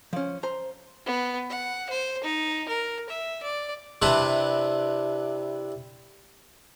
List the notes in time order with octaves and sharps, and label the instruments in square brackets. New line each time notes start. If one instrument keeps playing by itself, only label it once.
[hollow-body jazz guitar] F3 C#4
C5 A#5
[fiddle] B3
F#5
C5
D#4
A#4
E5
D5
[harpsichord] C3 C4 D4 E4 B4